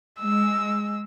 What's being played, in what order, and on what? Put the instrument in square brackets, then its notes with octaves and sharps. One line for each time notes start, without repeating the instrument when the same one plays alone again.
[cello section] G#3 [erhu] E6